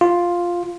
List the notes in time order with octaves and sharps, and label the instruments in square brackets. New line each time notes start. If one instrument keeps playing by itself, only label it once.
[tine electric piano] F4